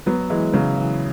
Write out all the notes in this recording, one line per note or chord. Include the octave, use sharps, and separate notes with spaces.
F#3 B3
E3 G#3
C#3 F#3
E3